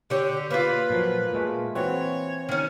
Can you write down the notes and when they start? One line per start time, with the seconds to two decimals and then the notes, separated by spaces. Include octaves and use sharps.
0.10 D3 G4 C#5
0.50 A#3 F4 B4
0.90 A#2 F3 F#3
1.33 A#2 G#3 A3
1.75 E3 C4 F#4 C#5
2.49 D#3 C#4